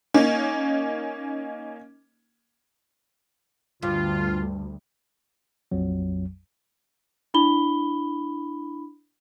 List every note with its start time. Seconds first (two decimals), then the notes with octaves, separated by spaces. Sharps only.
0.14 A#3 C#4 D#4
3.83 D2 G2 F4
5.71 A#1 F2 F#3
7.34 D4 E4 B5 G7